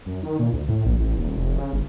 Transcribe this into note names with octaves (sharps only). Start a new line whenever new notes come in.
F#2
D#3
A#2
D2
A2
A#1
A1
D#1
F1
C#3
G1